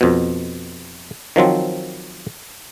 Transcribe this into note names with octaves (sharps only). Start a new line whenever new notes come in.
F2 B2
D#3 F3 F#3 C4